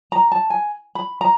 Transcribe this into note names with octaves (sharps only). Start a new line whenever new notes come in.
A#5
A5
G#5
B5
A#5